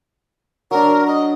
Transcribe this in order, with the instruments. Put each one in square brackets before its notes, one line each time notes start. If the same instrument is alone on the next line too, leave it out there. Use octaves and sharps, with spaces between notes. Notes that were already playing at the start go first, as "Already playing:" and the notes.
[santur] F#3 D4 [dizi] A#4
[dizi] D#5